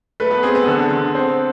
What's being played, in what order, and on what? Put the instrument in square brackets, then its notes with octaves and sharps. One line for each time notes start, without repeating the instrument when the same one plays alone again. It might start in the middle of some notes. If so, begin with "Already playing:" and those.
[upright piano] A3 [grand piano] B4
[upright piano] B3
[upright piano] C4 [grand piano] G#4
[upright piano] B3
[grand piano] D3
D3
C4